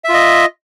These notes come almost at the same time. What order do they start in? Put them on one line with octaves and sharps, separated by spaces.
E5 F4 D#5